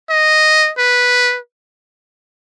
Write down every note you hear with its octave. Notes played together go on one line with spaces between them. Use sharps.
D#5
B4